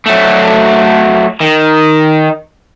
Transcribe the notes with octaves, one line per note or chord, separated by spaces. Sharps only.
F#3 A3
D#3